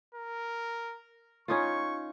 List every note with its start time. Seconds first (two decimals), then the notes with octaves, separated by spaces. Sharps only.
0.15 A#4
1.48 C#4 D#4 F4 C#6